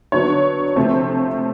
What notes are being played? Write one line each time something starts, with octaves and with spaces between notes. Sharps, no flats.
D3 F#3 B3 D4 C#5
C3 F3 A3 C4